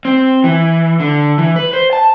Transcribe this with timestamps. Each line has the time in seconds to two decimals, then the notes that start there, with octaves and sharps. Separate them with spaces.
0.05 C4
0.44 E3
1.00 D3
1.38 E3
1.56 B4
1.73 C5
1.93 A5